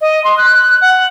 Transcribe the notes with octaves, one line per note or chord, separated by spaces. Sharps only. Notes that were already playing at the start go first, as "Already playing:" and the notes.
D#5
C6
F#6
F#5